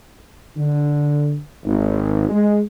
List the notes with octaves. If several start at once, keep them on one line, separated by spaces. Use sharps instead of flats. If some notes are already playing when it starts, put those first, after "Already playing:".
D3
G#1
G#3